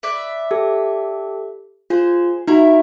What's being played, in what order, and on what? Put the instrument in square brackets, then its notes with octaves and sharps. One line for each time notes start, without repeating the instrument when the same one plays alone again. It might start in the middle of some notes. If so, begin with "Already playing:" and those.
[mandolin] B4 D5 E5
[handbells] G4 A4
[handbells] F4 [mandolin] G#4 C5
[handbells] D#4 F#4 [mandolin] E4 A#4